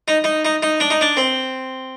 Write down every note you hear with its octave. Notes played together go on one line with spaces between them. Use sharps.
D#4
D#4
D#4
D#4
D4
D#4
D4
C4